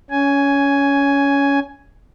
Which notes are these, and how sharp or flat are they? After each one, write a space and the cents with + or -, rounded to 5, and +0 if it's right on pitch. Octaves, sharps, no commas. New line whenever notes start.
C#4 +20 G#5 +5